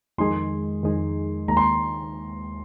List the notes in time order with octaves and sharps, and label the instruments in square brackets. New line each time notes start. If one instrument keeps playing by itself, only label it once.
[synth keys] F2 D#3 G#3 D#4 G#4 [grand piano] C6
[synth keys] F2 D#3 G#3 D#4 G#4
[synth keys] D#2 D#3 G#3 [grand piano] A#5
[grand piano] C6